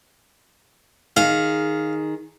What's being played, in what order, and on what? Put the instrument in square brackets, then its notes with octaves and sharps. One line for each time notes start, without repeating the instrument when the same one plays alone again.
[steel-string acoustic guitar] D#3 G#4 [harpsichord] F5